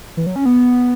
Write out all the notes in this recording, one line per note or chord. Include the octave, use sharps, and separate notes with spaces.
E3
F#3
C#4
B3